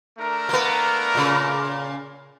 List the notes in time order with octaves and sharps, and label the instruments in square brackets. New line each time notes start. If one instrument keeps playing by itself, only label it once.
[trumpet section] A3 D4 A#4
[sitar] A#3 B3
A#2 C#3